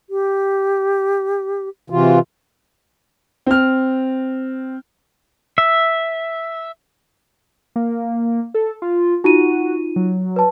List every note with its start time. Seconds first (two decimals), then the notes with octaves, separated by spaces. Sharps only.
0.10 G4
1.90 C3 E3 F4 F#4
3.46 C4 F6
5.58 E5
7.76 A#3
8.54 A4
8.82 F4
9.24 D#4 F4 F#4 D#7
9.96 F#3
10.36 B4 A5